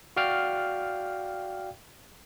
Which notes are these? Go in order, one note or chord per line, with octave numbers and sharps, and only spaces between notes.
F#4 D5 F5 G5 F6